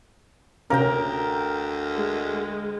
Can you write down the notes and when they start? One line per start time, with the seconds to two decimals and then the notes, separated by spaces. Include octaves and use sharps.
0.70 D2 C3 A#3 C#4 A#4 G5
1.94 G#3